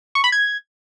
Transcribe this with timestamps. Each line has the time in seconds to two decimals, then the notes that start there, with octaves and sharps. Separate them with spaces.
0.15 C#6
0.24 B5
0.32 G#6